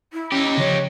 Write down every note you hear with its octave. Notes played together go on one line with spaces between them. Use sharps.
E4
C#4 D#4 G4
C#3 F3 C#5